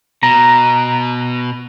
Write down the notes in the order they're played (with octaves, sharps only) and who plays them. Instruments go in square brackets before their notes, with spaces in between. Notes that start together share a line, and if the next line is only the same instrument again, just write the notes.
[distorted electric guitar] B2 [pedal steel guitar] A#5